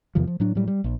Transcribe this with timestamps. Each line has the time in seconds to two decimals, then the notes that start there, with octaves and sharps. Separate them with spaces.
0.15 E2 C3 D#3 F3
0.27 F3
0.40 A2 F#3 D4
0.55 A2 F#3 G3
0.68 G3
0.84 A#1